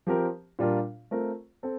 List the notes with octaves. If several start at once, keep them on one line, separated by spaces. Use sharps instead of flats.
F3 C4 G4 A#4
A#2 G3 D4 F4 A#4
A3 C4 F4 A#4
C4 A4